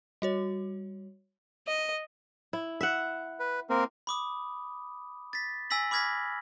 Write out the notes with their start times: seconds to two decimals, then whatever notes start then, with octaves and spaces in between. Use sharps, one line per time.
0.22 G3 F#4 C#5
1.67 D#5
2.53 E4
2.81 E5 F#5
3.40 B4
3.70 A#3 C4 A#4
4.07 B5 D6 D#6
5.33 A6 B6
5.70 G#5 E6 A#6 B6 F#7
5.91 B5 D6 F6 G#6 A#6 B6